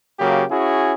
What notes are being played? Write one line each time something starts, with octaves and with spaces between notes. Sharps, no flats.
C#3 F#3 A#3 G4
C#4 E4 F#4 G#4